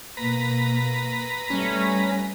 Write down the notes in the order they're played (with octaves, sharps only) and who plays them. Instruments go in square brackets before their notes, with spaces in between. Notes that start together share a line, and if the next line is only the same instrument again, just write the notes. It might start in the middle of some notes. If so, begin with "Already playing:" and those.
[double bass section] B2 A#3 [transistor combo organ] B4 A#5
[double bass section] G3 A3 [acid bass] C#4